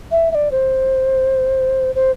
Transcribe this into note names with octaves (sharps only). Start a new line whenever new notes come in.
E5
E5
D5
C5
C5